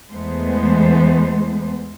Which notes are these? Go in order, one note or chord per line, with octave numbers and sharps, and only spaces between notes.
E2 E3 G#3 A3 B3 C5